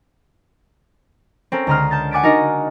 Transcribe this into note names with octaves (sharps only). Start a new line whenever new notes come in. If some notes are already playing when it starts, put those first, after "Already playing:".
C4 C#4 A4 A#4
C#2 D3 A#5 C6 D#6 F6
A5 G6 A6
F#5 G#5 D6 A6 B6 D7
D4 D#4 F#4 A#4 D#5